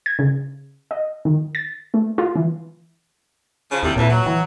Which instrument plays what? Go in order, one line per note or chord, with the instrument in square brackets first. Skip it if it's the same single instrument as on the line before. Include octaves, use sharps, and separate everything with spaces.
[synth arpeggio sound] G#6
C#3
D#5
D#3
A6
A3
F4
E3
[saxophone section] C#3 F3
[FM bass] D#2 [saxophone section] A2 C3 G3
[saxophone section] F2 E3 [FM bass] A#2
[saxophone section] F#3
[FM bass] E3